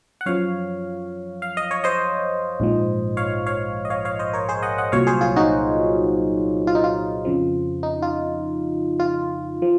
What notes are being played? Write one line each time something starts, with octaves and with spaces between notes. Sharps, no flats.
F#5
F#2 F3 C#5 F5
F5
D#5
C#5
C5 D#5
A#1 G#2 F3
C#5 F5
C#5 F5
D#5
C#5 F5
C#5 F5
C5 D#5
A#4 C#5
G#4 C5
D#5 F#5
D#5 F#5
C2 A#2 F#3 C#5 F5
G#4 C5
F4 G#4
D#4 F#4
F4
D#4
F4
F2 C#3 F3
D#4
F4
F4
F3